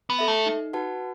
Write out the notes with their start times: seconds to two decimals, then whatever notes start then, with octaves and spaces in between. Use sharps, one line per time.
0.10 B3
0.19 A4 E5
0.28 A3
0.46 D#4
0.73 F#4 B4 F#5 A5